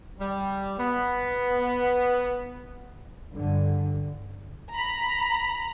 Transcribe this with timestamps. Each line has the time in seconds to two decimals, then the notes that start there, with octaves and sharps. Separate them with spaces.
0.19 G3
0.79 B3
3.34 G2 D3
4.73 A#5 B5